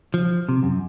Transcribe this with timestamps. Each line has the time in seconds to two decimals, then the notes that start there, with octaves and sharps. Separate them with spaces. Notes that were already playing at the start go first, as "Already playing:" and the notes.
0.14 F3
0.49 C3
0.63 F#2